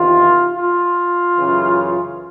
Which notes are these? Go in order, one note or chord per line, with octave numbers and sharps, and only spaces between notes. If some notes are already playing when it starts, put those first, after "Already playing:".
Already playing: E2 C3 D#3 F4
F4
F#2 C#3 E3